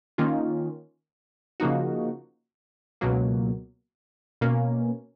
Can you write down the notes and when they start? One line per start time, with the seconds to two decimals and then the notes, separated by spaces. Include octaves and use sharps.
0.18 D#3 A#3 C#4 F4
1.60 C#3 F3 A#3 D#4 F#4
3.01 C#2 B2 F#3 A#3
4.41 B2 A#3 C#4